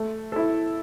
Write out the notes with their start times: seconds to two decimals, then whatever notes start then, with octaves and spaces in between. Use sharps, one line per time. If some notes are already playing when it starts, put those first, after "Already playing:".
Already playing: A3
0.32 E4 A4